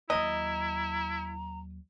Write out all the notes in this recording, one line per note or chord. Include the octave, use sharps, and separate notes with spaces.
D#2 F#3 E4 D#5 A#5